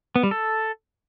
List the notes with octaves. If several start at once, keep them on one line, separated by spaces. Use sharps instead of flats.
B3
G3
A4